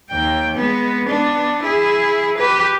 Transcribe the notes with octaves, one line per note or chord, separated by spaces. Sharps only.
D#2 G5
G#3 B3
B3 D4
E4 G#4
G4 B4